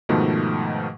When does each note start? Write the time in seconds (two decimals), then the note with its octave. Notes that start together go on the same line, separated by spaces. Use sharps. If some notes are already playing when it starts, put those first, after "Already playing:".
0.09 G#2 B2 D#3 F3 A3